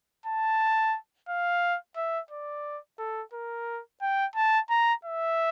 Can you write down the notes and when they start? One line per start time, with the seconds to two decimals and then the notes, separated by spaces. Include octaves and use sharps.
0.26 A5
1.29 F5
1.96 E5
2.31 D5
2.99 A4
3.33 A#4
4.02 G5
4.36 A5
4.70 A#5
5.05 E5